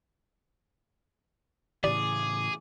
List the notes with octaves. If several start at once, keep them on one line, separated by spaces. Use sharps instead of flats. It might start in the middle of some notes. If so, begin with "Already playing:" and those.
A2 C#3 E3 G4 G#4 D5 D6